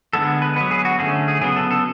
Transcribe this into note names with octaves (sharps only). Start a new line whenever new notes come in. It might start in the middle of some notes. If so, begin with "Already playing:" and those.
D3 G#3 B3 A4
B4
F#3 B3 B4
G#4
F#4
D3 A3 C#4 G#4
G#4
C#3 F#3 B3 G#4
A4
A4